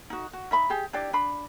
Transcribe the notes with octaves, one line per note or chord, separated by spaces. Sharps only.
D#4 F#4
F#4
D#4 E5 B5
G4 G#4
D4 E4 G4 D5
D4 B5